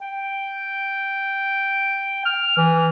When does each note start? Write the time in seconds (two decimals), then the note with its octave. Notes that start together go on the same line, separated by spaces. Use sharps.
0.01 G5
2.25 F6
2.57 E3